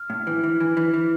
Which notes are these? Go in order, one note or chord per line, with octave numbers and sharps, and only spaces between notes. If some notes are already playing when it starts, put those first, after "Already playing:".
Already playing: F6
A2
E3
E3
E3
E3
E3